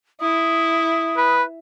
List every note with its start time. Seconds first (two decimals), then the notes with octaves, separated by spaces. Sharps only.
0.21 E4 D#6
1.17 B4